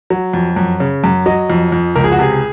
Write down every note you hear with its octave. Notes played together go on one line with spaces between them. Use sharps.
F#3
F2
F#2
C#3
F#2
F#3 D#5
F2
F2
C#2 A#4
G#4
F#4
C3 G#4